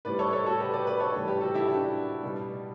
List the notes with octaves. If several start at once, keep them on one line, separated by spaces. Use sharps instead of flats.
A2 G3 B4 D5
A4 C#5
A4 C#5
F#4 A4
G4 B4
B4 D5
B4 D5
A4 C#5
A2 E3 G3
G4 B4
F#4 A4
E4 G4
D4 F#4
B2 G3